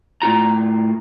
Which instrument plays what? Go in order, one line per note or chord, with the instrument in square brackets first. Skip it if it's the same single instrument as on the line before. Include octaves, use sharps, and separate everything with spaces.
[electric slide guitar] A2 F4 A#5